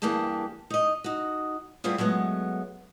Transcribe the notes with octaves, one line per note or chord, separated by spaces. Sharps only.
G2 E3 A#3 G4 G#4 A5
D#4 D#5
D#4 F#4
G3 A3 B3 C4 F4 G#4
F#3 G#3 A3 B3